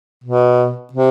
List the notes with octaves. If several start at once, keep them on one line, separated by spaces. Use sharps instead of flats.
B2
C3